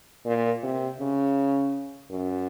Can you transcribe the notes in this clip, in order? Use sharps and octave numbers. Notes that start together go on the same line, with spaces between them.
A#2
C3
C#3
F#2